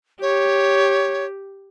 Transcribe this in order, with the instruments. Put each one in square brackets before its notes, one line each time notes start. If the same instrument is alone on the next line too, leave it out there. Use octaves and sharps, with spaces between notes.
[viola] G4 [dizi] C#5